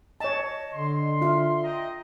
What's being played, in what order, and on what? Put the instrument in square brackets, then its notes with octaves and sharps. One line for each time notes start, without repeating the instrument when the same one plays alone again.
[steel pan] C#5 A5 [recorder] D#5
[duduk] D3 [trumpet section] C6
[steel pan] F4 [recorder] E5
[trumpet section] D#5 G5 A#5